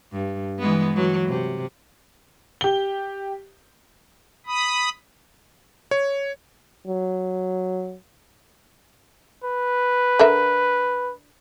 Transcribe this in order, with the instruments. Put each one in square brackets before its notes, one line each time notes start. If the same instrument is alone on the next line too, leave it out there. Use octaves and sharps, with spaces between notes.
[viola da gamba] G2
E3 G#3 B3
E3 F#3
C3
[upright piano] G4 G7
[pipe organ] B5 D#6
[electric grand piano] C#5
[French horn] F#3
[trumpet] B4
[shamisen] D3 A#4 E5